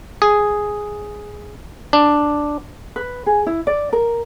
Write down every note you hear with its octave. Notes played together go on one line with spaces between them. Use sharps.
G#4
D4
B4
G#4
E4
D5
A#4